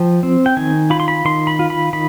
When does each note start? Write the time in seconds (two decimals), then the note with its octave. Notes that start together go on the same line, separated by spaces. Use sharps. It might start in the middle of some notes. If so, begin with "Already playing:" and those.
Already playing: F3 G5
0.23 C4
0.46 G5
0.57 D#3 G#5
0.90 F4 B5
1.00 C6
1.08 B5
1.25 D#3 C6
1.47 B5
1.59 F4
1.70 B5
1.93 D#3 B5